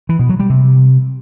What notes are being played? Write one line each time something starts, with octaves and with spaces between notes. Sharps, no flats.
E3
B2
F#3
G3
C3